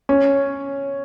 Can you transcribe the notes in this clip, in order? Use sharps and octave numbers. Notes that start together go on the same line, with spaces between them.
C#4